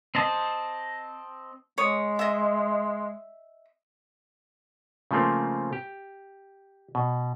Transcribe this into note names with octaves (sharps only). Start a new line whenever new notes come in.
C4 D#5 A5
G#3 C#5 D#6
D#5 E5
C#3 F3 A3 A#3 C4
G4
B2